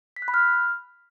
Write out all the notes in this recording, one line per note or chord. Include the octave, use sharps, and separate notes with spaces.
B6
F#6
B5
F6